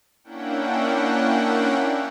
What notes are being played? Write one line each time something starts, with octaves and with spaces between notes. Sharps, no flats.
A#3 C#4 D4 E4 F#5 G5